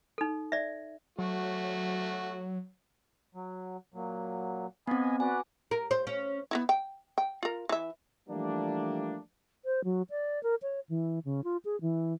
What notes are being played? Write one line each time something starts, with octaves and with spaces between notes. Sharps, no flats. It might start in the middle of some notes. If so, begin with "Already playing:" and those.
D#4 A4
D5 E5
F#3 A3 F#4
F#3
A#2 F#3
B3 C4 D#5 G#5 B5
F#4 B4 D5 G#5
A#4
C5
C#4
B3 D#4 E4
G5
G5
F4 A#4
E3 E5
E3 F3 G3 A3 A#3 D4
C5
F#3
D5
A#4
C#5
E3
C#3
F4
G#4
E3